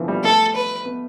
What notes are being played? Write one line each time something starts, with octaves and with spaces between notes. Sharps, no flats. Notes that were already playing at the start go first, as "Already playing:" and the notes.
Already playing: B2 D3 E3 F3
G3
A3 A4
B4
B3